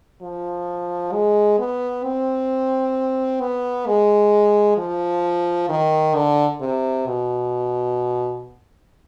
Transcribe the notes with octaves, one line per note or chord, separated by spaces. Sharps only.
F3
G#3
B3
C4
B3
G#3
F3
D#3
D3
C3
B2